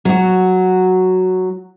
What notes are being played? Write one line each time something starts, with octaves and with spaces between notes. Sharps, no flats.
F#3 F#4